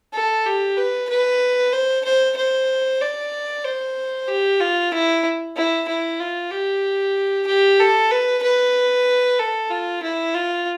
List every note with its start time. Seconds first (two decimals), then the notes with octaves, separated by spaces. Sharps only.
0.13 A4
0.46 G4
0.77 B4
1.09 B4
1.73 C5
2.05 C5
2.37 C5
3.01 D5
3.64 C5
4.28 G4
4.60 F4
4.92 E4
5.56 E4
5.88 E4
6.20 F4
6.52 G4
7.47 G4
7.80 A4
8.11 B4
8.43 B4
9.39 A4
9.70 F4
10.03 E4
10.34 F4